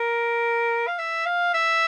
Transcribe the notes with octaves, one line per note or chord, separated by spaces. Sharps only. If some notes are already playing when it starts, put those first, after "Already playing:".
Already playing: A#4
F5
E5
F5
E5